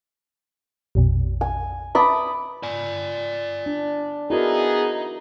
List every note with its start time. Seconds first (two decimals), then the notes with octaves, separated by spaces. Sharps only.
0.95 A#1 F2 B2
1.41 G#5
1.95 B4 E5 A5 B5 D6 D#6
2.63 D5 G#5
3.66 D4
4.30 B3 D#4 E4 F#4 G#4 A#4